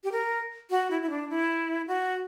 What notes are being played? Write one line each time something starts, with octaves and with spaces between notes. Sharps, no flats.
G4
A#4
F#4
E4
E4
D4
E4
F#4